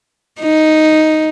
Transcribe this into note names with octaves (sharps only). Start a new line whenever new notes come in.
D#4